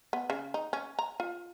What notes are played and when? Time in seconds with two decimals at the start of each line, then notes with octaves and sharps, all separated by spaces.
0.13 B3
0.30 C#3
0.54 D#4
0.73 C#4
0.99 A#5
1.20 F4